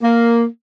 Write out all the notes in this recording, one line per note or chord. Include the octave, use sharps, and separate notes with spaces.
A#3